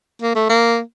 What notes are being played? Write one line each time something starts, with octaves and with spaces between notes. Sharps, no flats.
A#3
A3
A#3